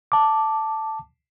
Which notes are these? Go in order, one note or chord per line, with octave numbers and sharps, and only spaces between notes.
A5 D6